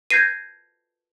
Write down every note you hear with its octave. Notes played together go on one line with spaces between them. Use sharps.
G6 G#6 A#6 C7 D#7